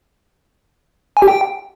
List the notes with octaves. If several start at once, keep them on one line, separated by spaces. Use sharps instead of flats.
G#5
G4
G5